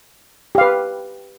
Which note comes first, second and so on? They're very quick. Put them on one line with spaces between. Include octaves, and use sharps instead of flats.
G4 F5 B4